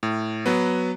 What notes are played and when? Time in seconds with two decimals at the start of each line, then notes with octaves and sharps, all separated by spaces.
0.03 A2
0.46 F#3 B3